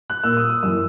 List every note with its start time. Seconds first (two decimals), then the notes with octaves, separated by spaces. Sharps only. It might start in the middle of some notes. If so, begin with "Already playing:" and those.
0.10 F#6
0.24 A#2 A#3 E6
0.37 D#6
0.50 D#6
0.63 F#2 E3 A#3 E6